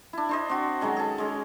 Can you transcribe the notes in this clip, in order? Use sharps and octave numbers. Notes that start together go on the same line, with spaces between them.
D4 E4
D4 C5 D#5
C4 F#4
D#3 F#3 G#3 C#4
G#4 A4
G#3 C#4